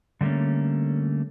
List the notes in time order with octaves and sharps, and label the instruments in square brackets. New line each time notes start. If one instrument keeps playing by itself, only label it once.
[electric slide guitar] D3 G3 A3 A#3 C#4